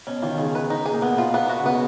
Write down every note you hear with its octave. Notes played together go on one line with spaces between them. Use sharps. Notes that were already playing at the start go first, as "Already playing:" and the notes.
B2 C#4
D#3 F4
C#3 G#4
B4
D#4
G#4
A#2
B2 B3
F4
B3
F#4
C#3
B2 B3